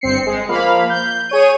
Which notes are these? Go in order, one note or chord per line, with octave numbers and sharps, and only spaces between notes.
G1 C4 C7 C#7
G#3
F3 A#3 F5 B5
G6
G#4 C#5 D#7